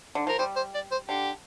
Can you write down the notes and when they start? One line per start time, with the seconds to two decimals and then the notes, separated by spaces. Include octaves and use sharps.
0.15 D3
0.27 F3 A#4
0.39 G3 C5
0.56 C5
0.74 D5
0.92 C5
1.09 D3 G4